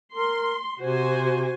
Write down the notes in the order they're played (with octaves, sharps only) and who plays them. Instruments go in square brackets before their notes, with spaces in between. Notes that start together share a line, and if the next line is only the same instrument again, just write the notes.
[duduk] A#4 [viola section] C6
[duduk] C3 [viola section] F#4 C5 G#5